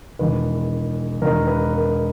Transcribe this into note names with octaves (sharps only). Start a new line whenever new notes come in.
E1 E2 D#3 B4
E1 E2 D#3 A#4
B4
A#4